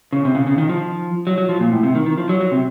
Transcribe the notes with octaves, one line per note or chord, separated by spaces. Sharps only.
C#3
C3
C#3
C#3
D#3
F3
F#3
F#3
F3
A#2
A2
C3
D#3
D#3
F3
F#3
F#3
C3